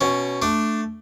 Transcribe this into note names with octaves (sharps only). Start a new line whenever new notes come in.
B2 C#4
A3 D4